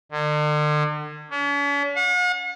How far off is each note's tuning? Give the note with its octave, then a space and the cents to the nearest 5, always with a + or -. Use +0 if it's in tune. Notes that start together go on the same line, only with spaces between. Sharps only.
D3 +40
C#4 +45
F#5 -45